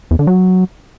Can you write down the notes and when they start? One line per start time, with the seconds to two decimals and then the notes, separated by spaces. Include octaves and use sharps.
0.11 E2
0.19 D3
0.27 F#3